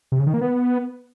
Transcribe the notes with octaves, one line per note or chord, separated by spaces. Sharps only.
C3
C#3
D#3
A#3
B3